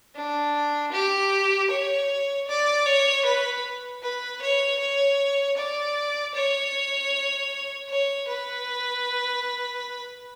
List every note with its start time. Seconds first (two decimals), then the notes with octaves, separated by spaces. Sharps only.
0.16 D4
0.92 G4
1.70 C#5
2.48 D5
2.86 C#5
3.25 B4
4.02 B4
4.41 C#5
4.79 C#5
5.56 D5
6.34 C#5
7.89 C#5
8.28 B4